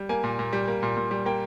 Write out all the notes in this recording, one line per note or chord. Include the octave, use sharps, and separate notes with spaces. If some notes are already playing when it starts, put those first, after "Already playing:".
Already playing: G3
A#3 G#5
A#2
A#2
G3
A#3
A#2
A#2
G3
A#3 G5